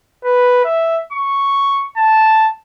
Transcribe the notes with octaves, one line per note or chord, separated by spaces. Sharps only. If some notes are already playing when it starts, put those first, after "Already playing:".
B4
E5
C#6
A5